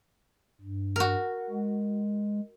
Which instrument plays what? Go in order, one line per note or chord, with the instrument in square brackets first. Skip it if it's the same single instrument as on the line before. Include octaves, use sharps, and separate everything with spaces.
[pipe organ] G2
[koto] F#4 A#4
[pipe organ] G#3